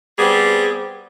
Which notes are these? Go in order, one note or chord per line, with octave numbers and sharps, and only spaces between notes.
G3 B3 C4 G#4